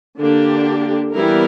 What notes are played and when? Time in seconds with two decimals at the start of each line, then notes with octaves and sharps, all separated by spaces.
0.18 D3 A#3 D4 G4
1.13 E3 G3 B3 E4 A#4